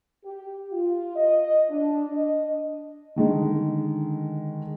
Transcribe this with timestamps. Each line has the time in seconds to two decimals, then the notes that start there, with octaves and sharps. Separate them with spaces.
0.25 G4
0.72 F4
1.15 D#5
1.69 D4
2.15 D#5
3.16 D3 D#3 G#3